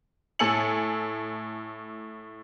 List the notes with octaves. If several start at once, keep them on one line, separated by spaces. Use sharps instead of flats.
A2 A4 G#5 E6 C#7 F#7